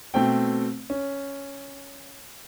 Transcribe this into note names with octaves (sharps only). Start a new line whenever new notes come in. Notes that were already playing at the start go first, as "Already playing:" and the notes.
B2 A3 C4 G5
C#4